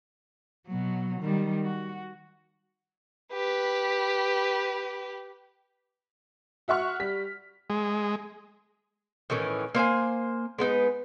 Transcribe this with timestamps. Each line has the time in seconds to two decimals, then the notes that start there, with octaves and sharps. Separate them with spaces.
0.68 B2 F#3
1.21 D#3 G3
1.64 F#4
3.33 G4 B4
6.68 F#4 E5 F#5 C#6 F6
7.00 G3 B6
7.70 G#3
9.30 A2 D#3 E3 C#4
9.75 A#3 C5 E5 G#5
10.59 G#3 B3 D#4 B4